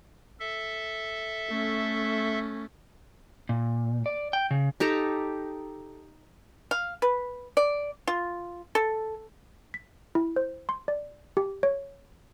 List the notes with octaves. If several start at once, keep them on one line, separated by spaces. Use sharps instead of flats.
A4 E5
A3 C#4
A#2
D5
G5
C#3
D#4 G4 A4 A#5
F5
B4
D5
F4
A4
B6
E4
C5
C6
D5
G4
C#5